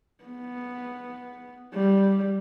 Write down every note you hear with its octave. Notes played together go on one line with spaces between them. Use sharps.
B3
G3